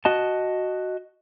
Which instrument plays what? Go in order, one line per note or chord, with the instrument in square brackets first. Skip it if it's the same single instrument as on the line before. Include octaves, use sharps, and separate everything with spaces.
[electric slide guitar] F#4 D#5 A5